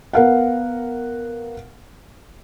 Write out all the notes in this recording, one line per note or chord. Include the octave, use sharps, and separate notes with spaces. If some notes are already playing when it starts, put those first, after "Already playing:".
B3 A#4 F5 F#5